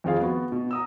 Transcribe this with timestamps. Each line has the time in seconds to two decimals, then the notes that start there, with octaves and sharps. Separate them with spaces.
0.04 F2 D#3 C4 F4 G#4 F5
0.20 B3 F#4
0.52 B2
0.71 A#5 D#6 E6